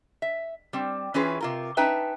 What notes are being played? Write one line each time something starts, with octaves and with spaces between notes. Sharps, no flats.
E5
G3 C4
E3 C#4 E4 F4 G#4 B4
C3 F4 A#4
C#4 D#4 B4 E5 G5 A5